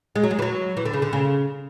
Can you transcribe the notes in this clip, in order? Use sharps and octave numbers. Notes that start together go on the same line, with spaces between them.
G#3
F#3
G#3
E3
F#3
E3
D3
C#3
D3
C#3